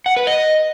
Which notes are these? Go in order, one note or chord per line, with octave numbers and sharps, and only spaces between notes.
F#5
B4
D#5